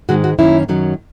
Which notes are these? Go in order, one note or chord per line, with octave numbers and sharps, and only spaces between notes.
G#2 D#3 G#3 F#4
F#4
F#2 D#3 A#3 C#4 E4
F#2 D#3 F#3 C#4